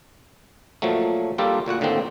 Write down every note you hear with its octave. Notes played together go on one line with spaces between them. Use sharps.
A#2 F3 F#3 A3
G3 A#3 D4 F4 G4 A4
D2 A#2 F#4 F#5
A2 D3 D#3 A#3 C4 D#4